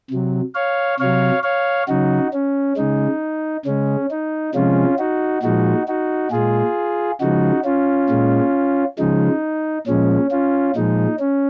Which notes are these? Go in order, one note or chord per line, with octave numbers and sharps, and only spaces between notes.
C3 F#3
C#5 F5
C3 F#3 C#5 F5
C#5 F5
C#3 F#3 D#4 F#4
C#4
C#3 G#3 D#4
C#3 G#3 C#4
D#4
C3 F3 G#3 C#4 F4
D#4 F#4
A#2 F3 G#3 D#4 F#4
D#4 F#4
A#2 G#3 F4 G#4
C#3 F3 G#3 D#4 F#4
C#4 F4
A#2 G#3
C#3 F3 G#3 D#4
A#2 F3 G#3 C#4
C#4 F4
A#2 F3 G#3 D#4
C#4